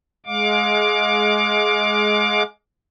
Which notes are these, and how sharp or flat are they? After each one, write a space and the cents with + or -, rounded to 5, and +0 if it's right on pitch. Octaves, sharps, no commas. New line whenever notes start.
G#3 +15 F5 +35 D6 +0